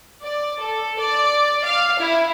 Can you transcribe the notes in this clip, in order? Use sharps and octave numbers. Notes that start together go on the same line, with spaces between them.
D5
A4
D5
F5
E4